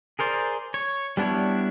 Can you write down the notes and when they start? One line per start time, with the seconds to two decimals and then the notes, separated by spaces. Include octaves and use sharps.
0.19 G#4 A#4 C5 D5
0.74 C#5
1.17 G3 B3 D4 E4 C#5